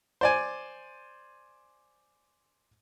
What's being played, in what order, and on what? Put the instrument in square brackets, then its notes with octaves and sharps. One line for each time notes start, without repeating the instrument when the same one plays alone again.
[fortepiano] C5 D5 G#5